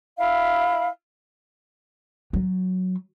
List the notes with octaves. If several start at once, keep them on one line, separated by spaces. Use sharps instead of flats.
E4 E5 F5 B5
F#3